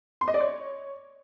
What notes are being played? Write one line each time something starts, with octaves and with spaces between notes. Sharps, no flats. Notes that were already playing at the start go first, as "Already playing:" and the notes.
C6
D#5
D5
C#5